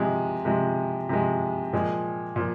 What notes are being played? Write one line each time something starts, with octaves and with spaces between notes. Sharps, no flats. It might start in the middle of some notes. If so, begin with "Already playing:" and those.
Already playing: C3 F3 G#3
C3 F3 G#3
C3 F3 G#3
A#2 F3 G#3
A#2 F3